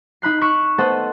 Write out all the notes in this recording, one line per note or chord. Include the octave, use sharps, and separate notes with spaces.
D#4 B5 F#6 C7
B5 C#6 E6 F#6 C#7 D7
A3 B3 A4 C5 D#5 F#5